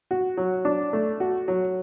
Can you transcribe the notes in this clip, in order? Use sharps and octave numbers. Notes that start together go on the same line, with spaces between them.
F#4
F#3
D4
A3
F#4
F#3